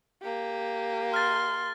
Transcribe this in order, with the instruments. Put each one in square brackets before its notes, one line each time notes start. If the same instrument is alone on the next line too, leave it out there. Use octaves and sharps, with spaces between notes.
[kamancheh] A#3 G4
[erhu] C6 [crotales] F6 A6